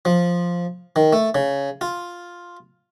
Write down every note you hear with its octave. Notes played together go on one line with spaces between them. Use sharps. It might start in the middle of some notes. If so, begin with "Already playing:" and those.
F3
D#3
A3
C#3
F4